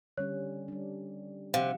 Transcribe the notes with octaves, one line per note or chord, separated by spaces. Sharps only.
D3 G3 C#4 C#5
G3 D4
C3 D#3 F3 F5 F#5